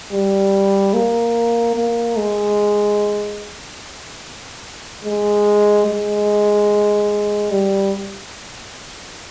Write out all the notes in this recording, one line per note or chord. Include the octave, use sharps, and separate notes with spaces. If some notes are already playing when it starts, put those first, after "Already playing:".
G3
A#3
A#3
G#3
G#3
G#3
G3